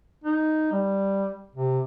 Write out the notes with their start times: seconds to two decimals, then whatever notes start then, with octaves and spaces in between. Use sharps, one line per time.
0.24 D#4
0.72 G3
1.55 C3